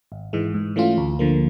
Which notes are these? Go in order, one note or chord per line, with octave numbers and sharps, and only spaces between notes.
G#1
G#2 E3 G#3
G#2
E3 A3 C#4 F4
D2
D3 F3 A#3